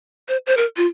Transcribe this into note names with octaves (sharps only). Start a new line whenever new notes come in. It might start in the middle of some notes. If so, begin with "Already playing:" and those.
C5
C5
A#4
F4